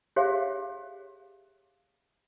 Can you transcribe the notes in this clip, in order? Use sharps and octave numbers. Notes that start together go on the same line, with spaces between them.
G4 G#4 C#5 E5 F5